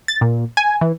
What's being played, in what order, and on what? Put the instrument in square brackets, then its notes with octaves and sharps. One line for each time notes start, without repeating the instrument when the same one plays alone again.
[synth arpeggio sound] A6
A#2
G#5
E3